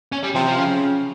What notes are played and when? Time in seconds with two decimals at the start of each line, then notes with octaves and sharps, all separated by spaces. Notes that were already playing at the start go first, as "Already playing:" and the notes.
0.12 C#4
0.23 G3
0.35 C3 F3
0.46 F3
0.56 C#3